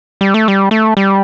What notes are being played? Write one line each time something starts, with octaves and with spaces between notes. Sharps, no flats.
G3
A3
G3
A3
G3